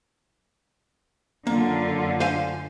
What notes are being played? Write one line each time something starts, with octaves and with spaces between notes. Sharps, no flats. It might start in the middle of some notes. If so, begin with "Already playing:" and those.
F#2 D3 A#3 F4
C5 F5 G#5